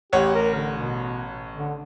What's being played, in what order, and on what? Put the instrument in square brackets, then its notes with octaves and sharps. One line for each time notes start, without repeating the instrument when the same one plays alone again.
[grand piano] A1 C#5 F#5 [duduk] G4
[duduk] A#4
D3
B2
D3